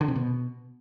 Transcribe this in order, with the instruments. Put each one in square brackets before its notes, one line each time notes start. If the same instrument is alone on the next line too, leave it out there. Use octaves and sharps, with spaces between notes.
[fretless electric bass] D3
C3
B2